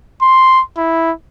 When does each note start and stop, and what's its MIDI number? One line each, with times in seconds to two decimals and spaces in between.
0.22 0.62 84
0.77 1.12 64